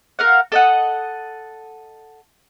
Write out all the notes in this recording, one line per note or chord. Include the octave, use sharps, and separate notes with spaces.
A#4 F5 F#5
A4 D#5 F#5